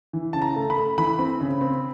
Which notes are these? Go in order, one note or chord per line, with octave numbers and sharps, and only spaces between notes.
E3
C#3 A5
A#5
A3
B5
A3
E3 B5
C4
C#3
C4